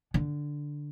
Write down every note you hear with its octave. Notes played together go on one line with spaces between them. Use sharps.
D3